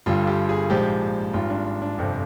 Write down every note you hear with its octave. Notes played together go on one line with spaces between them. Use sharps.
G1 G2 D3 G3 F4
G4
G#4
A#1 G#2 F3 G#3 G4
G#1 G#2 G3 F4
D4
D4
G1 F2 C3